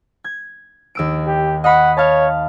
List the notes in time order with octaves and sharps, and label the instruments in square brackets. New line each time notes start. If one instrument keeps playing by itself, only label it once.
[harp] G#6
D#2 E6 D7
[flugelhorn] G4
[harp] D#5 B5 C#6 [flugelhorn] F#5
[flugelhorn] C#5 [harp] F5 A5